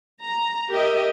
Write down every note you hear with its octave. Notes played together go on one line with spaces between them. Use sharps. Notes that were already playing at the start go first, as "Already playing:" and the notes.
A#5
G4 A#4 D#5 E5